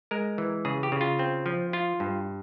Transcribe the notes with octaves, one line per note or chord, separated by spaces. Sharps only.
G#3 A#4
E3
C#3 G#4
G4
C#3
F4
C4
F3
F4
G2